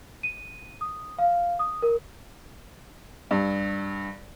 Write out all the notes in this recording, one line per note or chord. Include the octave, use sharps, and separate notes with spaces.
D#7
D#6
F5
D#6
A#4
G2